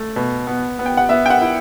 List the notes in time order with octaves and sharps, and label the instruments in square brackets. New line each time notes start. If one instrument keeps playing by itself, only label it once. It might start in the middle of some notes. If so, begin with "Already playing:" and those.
Already playing: [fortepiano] A3
B2
B3
B3
[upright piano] G5
F#5
[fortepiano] B3 [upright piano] E5
[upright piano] G5
F#5
[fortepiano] E4